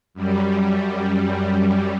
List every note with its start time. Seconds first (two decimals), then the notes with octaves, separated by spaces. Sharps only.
0.14 F#2 G3